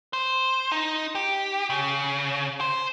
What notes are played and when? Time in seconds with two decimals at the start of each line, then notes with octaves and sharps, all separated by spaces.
0.13 C5
0.72 D#4
1.15 G4
1.70 C#3
2.61 C5